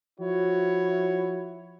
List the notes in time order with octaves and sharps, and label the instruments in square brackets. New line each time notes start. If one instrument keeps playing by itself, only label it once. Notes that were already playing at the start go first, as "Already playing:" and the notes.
[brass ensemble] F3 E4 F#4 C#5